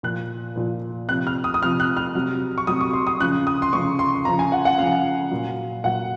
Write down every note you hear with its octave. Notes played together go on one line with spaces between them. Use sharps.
A#2 F3 F#6
A#2 F3
C3 F3 F#6
F6
D#6
D#6
C3 F3 F6
F#6
F6
C3 F#3
C#6
C3 F#3 D#6
C#6
C6
D#6
C#3 F3 F#6
D#6
C6
C#3 F3 C#6
C6
C#3 F3 A#5
G#5
F#5
F#5
C#3 F3 F5
A#2 F#3
A#2 F#3 F#5